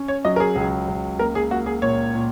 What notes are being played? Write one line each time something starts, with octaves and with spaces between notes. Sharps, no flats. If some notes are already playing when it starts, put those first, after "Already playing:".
Already playing: C#4
C#5
F#3 D#5
A#4
G#4
C#2
C#2
A#3 A#4
G#4
A#3 F#4
G#4
A#2 C#5
A#2